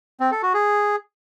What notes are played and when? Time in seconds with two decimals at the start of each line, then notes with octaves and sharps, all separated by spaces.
0.20 C4
0.31 A4
0.43 F#4
0.54 G#4